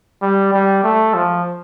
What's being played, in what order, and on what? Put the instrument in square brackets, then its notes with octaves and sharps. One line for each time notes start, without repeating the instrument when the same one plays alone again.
[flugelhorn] G3
G3
A3
F3